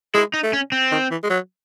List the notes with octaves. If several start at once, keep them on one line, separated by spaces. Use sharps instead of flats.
G#3 E4
D#4
A3
C#4
C4
D#3
E3
G#3
F#3